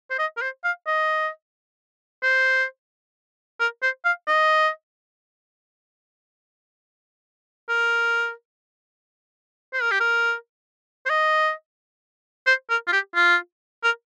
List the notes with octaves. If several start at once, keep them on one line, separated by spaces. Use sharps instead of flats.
C5
D#5
A#4
C5
F5
D#5
C5
A#4
C5
F5
D#5
A#4
C5
A#4
G4
A#4
C5
D#5
C5
A#4
F4
G4
F4
A#4